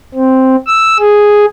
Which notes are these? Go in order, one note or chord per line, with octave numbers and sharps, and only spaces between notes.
C4
E6
G#4